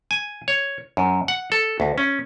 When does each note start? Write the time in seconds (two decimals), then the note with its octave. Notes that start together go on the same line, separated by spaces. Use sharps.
0.11 G#5
0.48 C#5
0.97 F#2
1.28 F#5
1.52 A4
1.80 D2
1.98 C#4